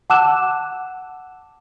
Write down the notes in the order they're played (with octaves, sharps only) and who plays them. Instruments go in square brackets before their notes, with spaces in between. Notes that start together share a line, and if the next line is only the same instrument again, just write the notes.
[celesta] F#5 A5 D6 E6 F#6 E7